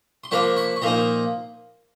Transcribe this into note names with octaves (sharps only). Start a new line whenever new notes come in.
C6
F3 A#3 D4 B5 C#6
B5 C#6
C#6
A#2 F3 A#3 D#4 A#5 C6